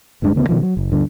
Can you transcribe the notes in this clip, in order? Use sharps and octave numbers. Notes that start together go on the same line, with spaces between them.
D1 G2 G#3 D4
D2 C#3 A#3 B3
B2 D#3 F3
F#3
F#1
D2 G2 D3